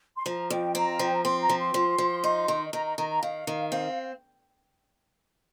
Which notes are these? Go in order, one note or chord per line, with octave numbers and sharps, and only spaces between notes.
C6
F3 A#5
F2 G5
C4 A#5
F5
F3 G5
A#5
C4 C6
A#5
F3
C6
F3
F3
D#4
D#3
D#3 A#5
A#5
D#3 A#5
A#5
D#3 F5
D#3
C4